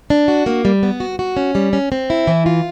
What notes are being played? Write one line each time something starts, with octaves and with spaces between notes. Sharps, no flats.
D4
F#4
A#3
G3
B3
F#4
F#4
C#4
G3
C#4
C4
E4
E3
F4